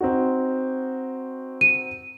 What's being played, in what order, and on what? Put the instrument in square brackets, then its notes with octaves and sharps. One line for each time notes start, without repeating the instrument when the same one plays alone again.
[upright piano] C4 D#4 F#4
[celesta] D#7